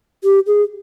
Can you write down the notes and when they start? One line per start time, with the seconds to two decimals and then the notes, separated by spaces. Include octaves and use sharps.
0.24 G4
0.47 G#4